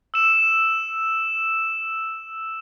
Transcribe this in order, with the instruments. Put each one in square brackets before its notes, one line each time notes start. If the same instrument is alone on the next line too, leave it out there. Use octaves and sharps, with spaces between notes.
[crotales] E6 E7